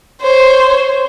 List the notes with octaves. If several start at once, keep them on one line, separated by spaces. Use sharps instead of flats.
C5 C#5